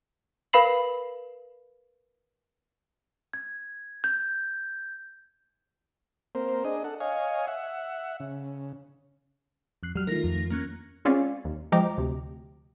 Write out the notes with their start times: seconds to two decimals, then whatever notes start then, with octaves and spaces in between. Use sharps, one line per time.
0.53 A#4 B4 F5 B5 C7 F#7
3.34 G#6
4.04 G6
6.35 A#3 C4 A#4 C5
6.64 D4 G#4 D#5
6.84 A4 F#5
7.00 C#5 D#5 F5 G#5
7.47 E5 F#5
8.20 C#3
9.83 F2 F#6 C7
9.96 F#3 G3 F6
10.07 D#3 A3 F4 A#4 A#6
10.24 F2
10.50 A#3 C#4 F#6
11.05 G#3 C4 C#4 F4 D5 F5
11.45 D#2
11.72 F3 G#3 D#5 G5 A#5 D6
11.98 D2 C3